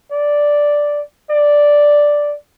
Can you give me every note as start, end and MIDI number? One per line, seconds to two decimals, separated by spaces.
0.12 1.01 74
1.31 2.35 74